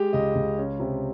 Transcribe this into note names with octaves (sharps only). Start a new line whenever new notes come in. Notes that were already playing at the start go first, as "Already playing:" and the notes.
Already playing: G#3 G4
C#2 D#5
C#2
C#4
C3